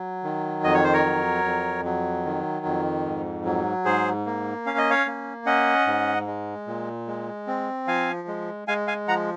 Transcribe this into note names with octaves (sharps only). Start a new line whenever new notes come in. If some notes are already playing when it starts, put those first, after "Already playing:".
Already playing: F#3
D#3
F2 D#5
C#5
C5
A#4 C#5
F#3
F2
F#3
D#3
F2
G#2
F#3
G#2 G#4 C5
A#3
C#4 F5
D#5
C#5 F5
A#3
C#4 D#5 F#5
G#2
G#3
A#2
G#3
C4
F3 F5 G#5
G#3
G#3 F5 G#5
F5 G#5
F3 F#5 A#5